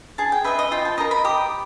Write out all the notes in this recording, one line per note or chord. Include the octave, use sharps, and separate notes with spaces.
G#4 A5
G5
B4 D#5 E5
D#5
F4 G5
A5
A#4 D#5 A#5
B5
G4 D#6